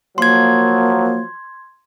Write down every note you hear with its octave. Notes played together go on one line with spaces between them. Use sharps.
F3 F#3 A#3 C6 G#6